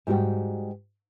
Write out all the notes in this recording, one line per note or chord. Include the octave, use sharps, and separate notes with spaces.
G#2 G3 F#4 G5